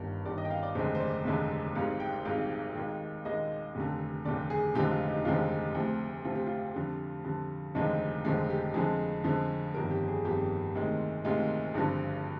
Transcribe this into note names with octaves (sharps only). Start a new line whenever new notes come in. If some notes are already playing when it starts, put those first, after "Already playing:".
Already playing: G1 G2 D#3
G1 G2 D#3 D5
D#5
G5
F5
D5
F1 D#2 D3 G#3 C5
C5
D5
F1 D#2 D3 G#3
G#1 G#2 G3 F5
G5
G#1 G#2 G3 F5
D#2 D#3 G#3
D#2 D#3 G#3 D#5
F1 D#2 D3
F1 D#2 D3 D5
G#4
F1 D#2 D3 F3 G#3 G4
F4
D#4
F1 D#2 D3 F3 G#3 F4
D2 C3 F3
D2 C3 F3 F4
G4
F4
F2 D3 G3
F2 D3 G3
F1 D#2 D3 F3 G#3 D#4
F1 D#2 D3 F3 G#3
G4
F2 D3 F3 G#3 G#4
F2 D3 F3 G#3
G1 F2 D#3 G3 A#4
G4
G#4
G1 F2 D#3 G3 G4
D2 C3 D#3 G#3
D2 C3 D#3 G#3 F4
G#1 G2 D3 F3